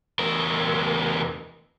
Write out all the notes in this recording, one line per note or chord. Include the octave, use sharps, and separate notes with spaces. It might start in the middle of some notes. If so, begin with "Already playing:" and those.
E2 A#4